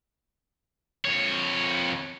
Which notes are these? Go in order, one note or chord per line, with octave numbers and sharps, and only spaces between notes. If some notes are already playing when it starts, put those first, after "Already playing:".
F2 C#5